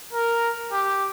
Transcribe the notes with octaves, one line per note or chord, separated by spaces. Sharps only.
A#4
G4